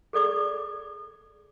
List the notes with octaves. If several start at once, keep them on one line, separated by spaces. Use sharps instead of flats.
G#4 A4 D5 D6